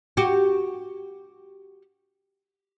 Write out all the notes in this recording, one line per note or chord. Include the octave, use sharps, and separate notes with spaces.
F#4 G4